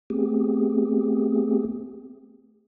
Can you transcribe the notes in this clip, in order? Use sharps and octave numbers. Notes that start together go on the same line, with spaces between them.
A3 B3 C4 G4 G#4